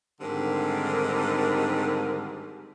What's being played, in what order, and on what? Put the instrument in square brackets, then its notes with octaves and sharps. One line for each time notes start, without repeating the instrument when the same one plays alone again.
[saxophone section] G#2 D3 D#3 G3 C4 A#4